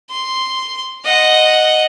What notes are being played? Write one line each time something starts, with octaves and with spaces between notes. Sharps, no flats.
C6
D#5 F#5